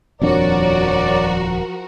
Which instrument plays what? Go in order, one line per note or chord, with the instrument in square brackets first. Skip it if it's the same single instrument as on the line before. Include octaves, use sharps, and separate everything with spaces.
[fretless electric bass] D#1 F2 D4 [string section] F3 F#4 A#4 [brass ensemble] C#5 D5